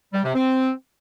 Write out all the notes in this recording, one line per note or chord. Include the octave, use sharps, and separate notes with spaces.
G3
C3
C4